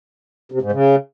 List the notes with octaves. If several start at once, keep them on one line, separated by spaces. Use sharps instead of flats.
C3
G#2
C#3